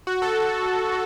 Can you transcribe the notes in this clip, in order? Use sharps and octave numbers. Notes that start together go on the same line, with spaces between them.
F#4
A4